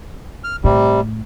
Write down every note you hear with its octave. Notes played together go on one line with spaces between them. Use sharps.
F6
A2 C3 G3